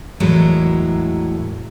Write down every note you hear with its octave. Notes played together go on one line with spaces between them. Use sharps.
E2 A2 F#3 G#3 E4 A#4